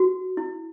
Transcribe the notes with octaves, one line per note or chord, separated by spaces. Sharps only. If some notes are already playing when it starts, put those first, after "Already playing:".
Already playing: F#4
E4